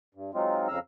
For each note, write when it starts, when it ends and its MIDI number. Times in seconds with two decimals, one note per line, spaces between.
0.15 0.31 43
0.34 0.68 54
0.34 0.68 56
0.34 0.68 60
0.34 0.68 63
0.34 0.68 65
0.68 0.79 41
0.68 0.79 49
0.68 0.79 77
0.68 0.79 82
0.68 0.79 88
0.68 0.79 89